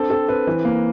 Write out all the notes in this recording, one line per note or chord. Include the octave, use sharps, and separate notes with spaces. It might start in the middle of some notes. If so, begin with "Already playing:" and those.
Already playing: C4 D4 A4
C4 A4
C4 B4
E3
A#3